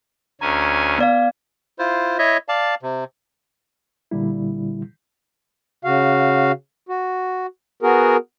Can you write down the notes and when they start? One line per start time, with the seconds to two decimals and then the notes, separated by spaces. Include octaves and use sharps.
0.41 D2 C#4 G#5 A#5
0.98 B3 D5 F5
1.79 E4 F4 C5
2.19 E4 C#5 D#5 E5
2.48 D5 F5 A5
2.82 C3
4.11 A#2 D3 G3 E4
5.85 C#3 F#4 F5
6.89 F#4
7.82 B3 F#4 G#4 A#4